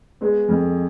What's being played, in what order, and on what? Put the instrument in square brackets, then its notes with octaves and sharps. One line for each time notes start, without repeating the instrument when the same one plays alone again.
[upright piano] G#3 [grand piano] B3
[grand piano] F2